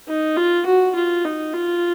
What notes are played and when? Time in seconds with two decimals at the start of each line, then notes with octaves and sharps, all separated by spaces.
0.08 D#4
0.37 F4
0.66 F#4
0.96 F4
1.25 D#4
1.53 F4